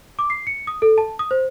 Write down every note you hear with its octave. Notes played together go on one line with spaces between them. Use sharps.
D6
C7
C#7
D#6
A4
A5
D#6
C5